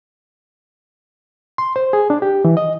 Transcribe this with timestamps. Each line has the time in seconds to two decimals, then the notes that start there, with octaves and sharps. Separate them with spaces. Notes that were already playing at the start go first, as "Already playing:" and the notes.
1.58 C6
1.76 C5
1.93 G#4
2.10 D4
2.22 G4
2.45 E3
2.57 D#5